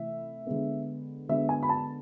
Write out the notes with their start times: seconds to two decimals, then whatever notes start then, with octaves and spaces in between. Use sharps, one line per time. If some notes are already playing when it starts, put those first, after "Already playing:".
Already playing: C3 E3 A3 E4 E5
0.47 D3 G#3 B3
1.29 D3 G#3 B3 E5
1.49 G#5
1.63 B5
1.69 A5